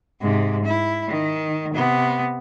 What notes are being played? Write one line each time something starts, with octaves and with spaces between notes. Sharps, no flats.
G#2 C3
E4
D#3
C3 B3